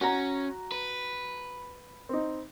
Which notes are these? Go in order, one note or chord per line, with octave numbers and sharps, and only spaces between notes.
C#4 F#4 A#5
B4
C4 D#4